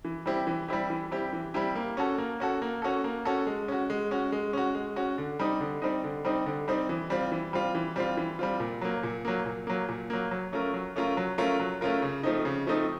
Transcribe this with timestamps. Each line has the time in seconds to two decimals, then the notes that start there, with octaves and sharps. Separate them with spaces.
0.05 E3
0.26 G3 C4 E4 G4
0.47 E3
0.68 G3 C4 E4 G4
0.90 E3
1.11 G3 C4 E4 G4
1.33 E3
1.54 G3 C4 E4 G4
1.75 A#3
1.97 C#4 F#4 A4
2.18 A#3
2.40 C#4 F#4 A4
2.62 A#3
2.82 C#4 F#4 A4
3.04 A#3
3.25 C#4 F#4 A4
3.47 G#3
3.68 C#4 F#4
3.90 G#3
4.11 C#4 F#4
4.32 G#3
4.53 C#4 F#4
4.75 G#3
4.96 C#4 F#4
5.18 D3
5.39 G3 C4 D#4
5.61 D3
5.82 G3 C4 D#4
6.04 D3
6.25 G3 C4 D#4
6.46 D3
6.68 G3 C4 D#4
6.89 E3
7.10 G3 C4 F4
7.32 E3
7.53 G3 C4 F4
7.75 E3
7.96 G3 C4 F4
8.17 E3
8.39 G3 C4 F4
8.60 A#2
8.81 F#3 A#3
9.03 A#2
9.25 F#3 A#3
9.46 A#2
9.67 F#3 A#3
9.89 A#2
10.10 F#3 A#3
10.31 F#3
10.53 A3 C#4 F4 A#4
10.74 F#3
10.96 A3 C#4 F4 A#4
11.17 F#3
11.38 A3 C#4 F4 A#4
11.60 F#3
11.81 A3 C#4 F4 A#4
12.02 C#3
12.23 F3 A3 C4 D#4
12.45 C#3
12.67 F3 A3 C4 D#4